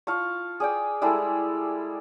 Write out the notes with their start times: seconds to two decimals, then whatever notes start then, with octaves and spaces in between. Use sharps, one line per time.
0.07 F4 F5 A5 C#6
0.60 G#4 D5 G5
1.02 G3 G#3 E4 A4